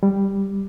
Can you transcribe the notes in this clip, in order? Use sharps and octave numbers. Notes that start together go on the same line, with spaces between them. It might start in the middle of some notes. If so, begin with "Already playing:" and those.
G3